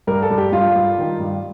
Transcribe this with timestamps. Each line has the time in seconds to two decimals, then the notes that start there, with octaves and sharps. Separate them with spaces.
0.07 G2 A#4
0.22 A4
0.30 G2
0.38 G4
0.52 G2 F4
0.75 G2
0.98 D#3
1.20 G2